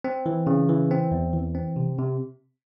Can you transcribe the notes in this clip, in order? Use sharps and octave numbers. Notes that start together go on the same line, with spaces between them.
C4
E3
C#3
E3
C4
E2
E3
C4
C3
C3